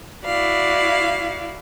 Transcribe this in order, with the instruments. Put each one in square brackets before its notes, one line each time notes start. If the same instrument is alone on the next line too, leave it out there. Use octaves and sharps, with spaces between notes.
[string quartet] E4 F#4 D5 F5